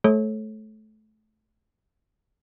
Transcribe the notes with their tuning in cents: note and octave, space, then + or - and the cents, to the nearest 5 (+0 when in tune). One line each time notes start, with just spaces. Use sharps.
A3 -25 A4 -25 C#5 -30